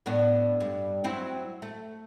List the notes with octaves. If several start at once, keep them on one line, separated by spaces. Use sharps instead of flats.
A2 B3 D4
G2
F#3 C4 E4
A3